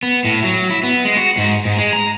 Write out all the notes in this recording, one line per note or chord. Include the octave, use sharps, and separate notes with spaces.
B3
A2
F#3
E4
B3
G#3
F#4
G#2
G#2
G#3
A#5